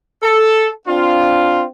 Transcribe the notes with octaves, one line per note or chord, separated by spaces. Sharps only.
A4
C4 D4 F4